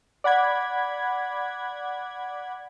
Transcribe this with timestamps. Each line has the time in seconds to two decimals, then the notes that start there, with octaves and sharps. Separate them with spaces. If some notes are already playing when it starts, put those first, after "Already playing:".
0.24 D5 F#5 B5 G#6